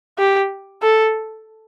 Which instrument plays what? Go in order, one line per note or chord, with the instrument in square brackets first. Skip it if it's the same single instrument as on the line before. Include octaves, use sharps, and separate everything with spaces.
[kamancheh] G4
A4